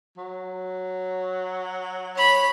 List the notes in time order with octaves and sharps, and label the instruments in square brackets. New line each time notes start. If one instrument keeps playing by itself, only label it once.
[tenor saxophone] F#3
[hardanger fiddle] C#5 B5